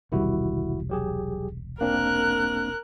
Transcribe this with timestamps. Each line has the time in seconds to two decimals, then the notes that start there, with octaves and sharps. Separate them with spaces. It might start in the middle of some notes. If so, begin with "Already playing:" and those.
0.12 E1 C2 D#3 G3 E4 F#4
0.90 F#3 G4 G#4
1.81 A#3 C4 D4 A#4 F#6